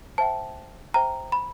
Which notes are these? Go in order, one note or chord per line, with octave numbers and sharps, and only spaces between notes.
C5 E5 G5 A5
C5 E5 G5 A#5
B5